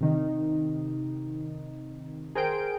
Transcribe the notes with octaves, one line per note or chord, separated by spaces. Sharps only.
C3 D#3 D#4
G#4 A#4 C5 G5 D7